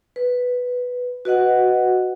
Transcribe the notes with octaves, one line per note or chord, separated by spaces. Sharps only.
B4
F#4 B4 D#5 F#5